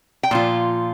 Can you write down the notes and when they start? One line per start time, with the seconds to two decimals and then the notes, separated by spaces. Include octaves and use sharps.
0.23 G5
0.31 A#2 F3 F4